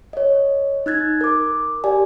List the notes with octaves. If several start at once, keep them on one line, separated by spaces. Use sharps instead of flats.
C#5 D#5
D#4 F#6 G#6 A6
A#4 D6
G4 D5 G#5